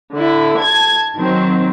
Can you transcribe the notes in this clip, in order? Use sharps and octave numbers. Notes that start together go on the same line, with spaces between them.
D3 E4
A5 G#6
D#3 F#3 C4